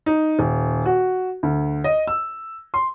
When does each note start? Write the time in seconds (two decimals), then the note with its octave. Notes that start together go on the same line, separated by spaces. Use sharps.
0.06 D#4
0.39 D#1
0.86 F#4
1.43 D2
1.84 D#5
2.07 E6
2.74 C6